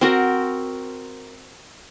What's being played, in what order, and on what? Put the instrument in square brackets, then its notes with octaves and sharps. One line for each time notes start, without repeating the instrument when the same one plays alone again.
[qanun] C4 F#4 A#4